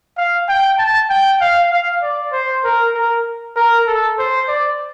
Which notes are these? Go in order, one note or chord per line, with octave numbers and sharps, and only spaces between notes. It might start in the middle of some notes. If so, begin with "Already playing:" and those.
F5
G5
A5
G5
F5
F5
D5
C5
A#4
A#4
A#4
A4
C5
D5